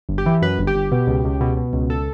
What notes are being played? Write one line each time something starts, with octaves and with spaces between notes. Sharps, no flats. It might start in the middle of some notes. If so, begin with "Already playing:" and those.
G1
G4
E3
F#2 B4
G1
G4
G1
B2
C#2
C#2
B2
B2
C#2
A4